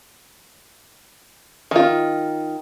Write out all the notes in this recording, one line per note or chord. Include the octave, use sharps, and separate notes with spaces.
D#3 F4